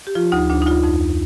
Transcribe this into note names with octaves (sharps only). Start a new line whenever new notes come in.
G4
F3 F4
D2 D#4
D2 D4
D#4
D2 F4
F2 D#4